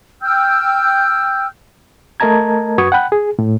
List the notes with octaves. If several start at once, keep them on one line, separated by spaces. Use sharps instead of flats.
G5 E6 F6 G6
A3 A#4 D#5 A5 A#5 G#6
F#2 F#4 B4 C#6 D#6 G#6
F#5 G5 B5 F#6
G#4
A2